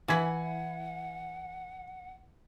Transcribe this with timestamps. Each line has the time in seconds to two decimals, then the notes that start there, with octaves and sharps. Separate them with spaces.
0.08 E3 E4 F#5 G#5 G#6 B6